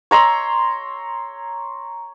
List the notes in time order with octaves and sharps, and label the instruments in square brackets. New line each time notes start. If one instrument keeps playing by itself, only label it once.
[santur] C#5 A#5 C6 E6